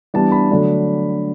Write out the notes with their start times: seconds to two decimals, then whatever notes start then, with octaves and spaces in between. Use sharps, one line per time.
0.14 E3 G3 B3 D4 A5
0.32 B5
0.51 D3 F#3 A3 D4